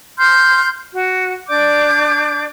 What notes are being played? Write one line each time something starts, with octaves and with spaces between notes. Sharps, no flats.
C6 F6 G6
F#4
D4 D5 D6 G6